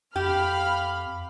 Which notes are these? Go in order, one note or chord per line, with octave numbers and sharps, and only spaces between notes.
F2 G4 F5 B5 F6